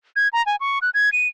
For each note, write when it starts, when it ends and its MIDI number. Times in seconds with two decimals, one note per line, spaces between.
0.16 0.28 92
0.33 0.44 82
0.46 0.56 80
0.60 0.79 85
0.82 0.90 90
0.94 1.10 92
1.13 1.28 99